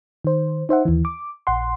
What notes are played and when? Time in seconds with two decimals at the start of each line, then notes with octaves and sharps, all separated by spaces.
0.24 D#3 C5
0.69 D#4 C5 E5 F#5
0.85 D#2 E3
1.05 D6
1.47 A#1 F#5 C6